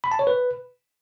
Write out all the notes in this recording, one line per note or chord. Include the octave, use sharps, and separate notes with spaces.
B5
A5
C#5
B4